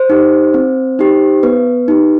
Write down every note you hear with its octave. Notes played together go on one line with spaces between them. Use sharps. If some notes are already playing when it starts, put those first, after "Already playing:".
Already playing: C5
D#4 G4
C4
D#4 G4
B3 B4
D#4 G4